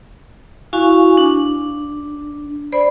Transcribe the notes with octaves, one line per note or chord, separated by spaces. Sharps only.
E4 F#4 F5 G#5 C#6
D4
C5 D5 B5